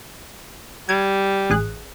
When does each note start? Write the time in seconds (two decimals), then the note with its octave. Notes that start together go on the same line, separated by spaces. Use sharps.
0.89 G3 G#6
1.50 A1 G#4 F#6